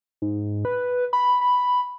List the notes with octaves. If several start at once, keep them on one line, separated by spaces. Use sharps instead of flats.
G#2
B4
B5
B5